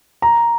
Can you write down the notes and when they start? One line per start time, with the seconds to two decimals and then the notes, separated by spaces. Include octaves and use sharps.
0.22 A#5